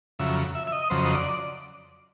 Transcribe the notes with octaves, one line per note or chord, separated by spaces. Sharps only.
F2 C#3 F#3 E5
E5
E5
D#5
F2 C#3 F#3 C5
D#5
D5